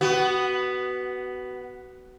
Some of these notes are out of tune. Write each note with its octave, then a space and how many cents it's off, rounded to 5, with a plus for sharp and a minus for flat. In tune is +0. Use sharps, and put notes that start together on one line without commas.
B3 +0 F#4 +25